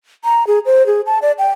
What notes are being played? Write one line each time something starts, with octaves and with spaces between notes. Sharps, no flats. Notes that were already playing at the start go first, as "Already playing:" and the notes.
A#5
G#4
C5
G#4
A5
D5
G5